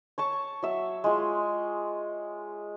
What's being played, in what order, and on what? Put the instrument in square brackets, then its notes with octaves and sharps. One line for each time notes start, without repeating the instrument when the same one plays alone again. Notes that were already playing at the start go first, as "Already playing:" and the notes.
[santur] C#5 A5 C#6
F#3 E5
G#3 F4